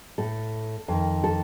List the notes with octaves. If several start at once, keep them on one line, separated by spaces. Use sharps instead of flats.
A2 A4
F2 D#3
A4